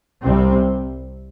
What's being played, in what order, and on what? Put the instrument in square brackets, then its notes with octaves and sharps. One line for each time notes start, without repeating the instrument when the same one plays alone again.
[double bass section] C2 C3 G3 C4